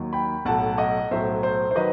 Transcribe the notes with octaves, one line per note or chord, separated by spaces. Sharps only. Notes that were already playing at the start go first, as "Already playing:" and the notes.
Already playing: D#2 D#3 F#3
G5 B5
B1 A2 F#3 F#5 A5
D#5 F#5
B1 A2 F#3 C5 E5
C5
C5
D#3 F#3 B4 D#5